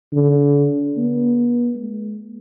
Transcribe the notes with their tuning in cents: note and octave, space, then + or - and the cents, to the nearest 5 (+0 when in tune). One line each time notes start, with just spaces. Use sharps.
D3 -40
B3 -40
G#3 +25